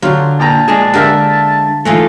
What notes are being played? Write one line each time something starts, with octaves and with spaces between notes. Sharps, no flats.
D3 F#3 F4 G4
A#2 G5 A5 A#5
G#3 D4 G#4
D3 A#3 E4 G4 A#4 E5
E3 G#3 A3 D#4 F4